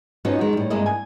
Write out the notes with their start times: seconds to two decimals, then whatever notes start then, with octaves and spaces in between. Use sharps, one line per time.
0.25 F3 B3 C#4 D#4 F#4
0.39 D#3 G#3
0.53 A2 G3
0.70 G2 C3 G#3 A#3 E4 D#5
0.86 G#5